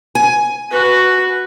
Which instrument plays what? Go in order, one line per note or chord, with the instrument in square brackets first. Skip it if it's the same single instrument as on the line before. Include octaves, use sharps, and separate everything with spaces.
[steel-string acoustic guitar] G#5
[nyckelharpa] F#4 B4